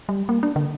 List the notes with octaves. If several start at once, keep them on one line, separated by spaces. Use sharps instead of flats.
G3
A#3
D4
D3